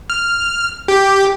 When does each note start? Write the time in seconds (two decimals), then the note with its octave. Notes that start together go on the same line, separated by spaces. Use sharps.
0.10 F6
0.88 G4